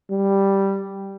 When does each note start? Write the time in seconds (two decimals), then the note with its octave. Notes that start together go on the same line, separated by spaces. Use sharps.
0.10 G3